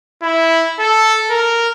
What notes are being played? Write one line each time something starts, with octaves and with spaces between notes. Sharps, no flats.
E4
A4
A#4